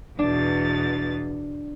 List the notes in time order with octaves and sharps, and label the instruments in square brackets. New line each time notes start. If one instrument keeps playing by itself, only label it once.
[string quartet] E2 B2 A6 [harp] D4